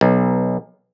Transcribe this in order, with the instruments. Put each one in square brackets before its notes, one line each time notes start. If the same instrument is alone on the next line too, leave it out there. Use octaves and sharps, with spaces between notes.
[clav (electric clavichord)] B1